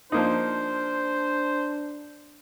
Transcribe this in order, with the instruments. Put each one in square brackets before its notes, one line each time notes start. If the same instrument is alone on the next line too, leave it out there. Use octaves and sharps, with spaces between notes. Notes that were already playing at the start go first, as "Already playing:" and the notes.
[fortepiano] F3 A#3 D#4 [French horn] D4 [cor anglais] C5